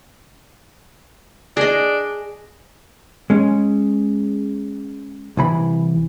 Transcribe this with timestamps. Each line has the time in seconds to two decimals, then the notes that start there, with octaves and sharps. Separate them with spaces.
1.57 D4 G#4 D#5
3.30 G#3 C#4
5.37 C2 E3 B5